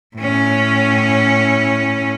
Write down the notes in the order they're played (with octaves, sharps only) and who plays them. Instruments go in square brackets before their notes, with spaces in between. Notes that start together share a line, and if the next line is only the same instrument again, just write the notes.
[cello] A2 C#4